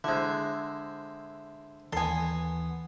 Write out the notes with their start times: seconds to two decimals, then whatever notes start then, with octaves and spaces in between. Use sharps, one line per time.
0.04 D3 G#3 E4 C5
1.93 D#2 E3 B3 A4 G#5 C6